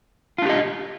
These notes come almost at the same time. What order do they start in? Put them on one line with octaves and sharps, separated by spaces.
F4 D4 G4 D#5